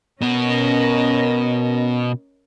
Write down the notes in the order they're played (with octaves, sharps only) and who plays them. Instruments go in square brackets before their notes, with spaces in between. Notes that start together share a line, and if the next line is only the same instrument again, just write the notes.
[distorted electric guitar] B2 B3 [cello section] C#4 A#4 D#5